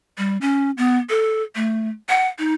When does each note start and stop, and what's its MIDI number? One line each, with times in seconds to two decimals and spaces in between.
0.18 0.37 55
0.41 0.71 61
0.78 0.98 59
1.10 1.42 69
1.55 1.89 57
2.09 2.28 78
2.39 2.54 63